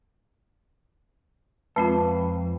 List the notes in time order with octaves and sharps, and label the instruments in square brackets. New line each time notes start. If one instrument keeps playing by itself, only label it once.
[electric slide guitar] F2 [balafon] G#3 C4 F4 [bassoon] B4 [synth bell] A5